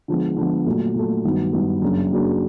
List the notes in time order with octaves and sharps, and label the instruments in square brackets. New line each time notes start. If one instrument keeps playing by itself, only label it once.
[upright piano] D3 F3 G#3 B3
D3 F3 G#3 B3
A#2 F#3 A3
A#2 F#3 A3
G2 D#3 F#3 B3
G2 D#3 F#3 B3
F#2 C#3 F#3 A#3 D4
F#2 C#3 F#3 A#3 D4